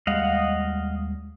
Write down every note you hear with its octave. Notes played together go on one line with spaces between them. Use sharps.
D#2 G3 G#3 D#5 F5 F#5